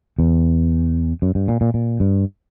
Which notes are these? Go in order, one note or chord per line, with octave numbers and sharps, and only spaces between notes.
E2
F#2
G2
A#2
A#2
A#2
G2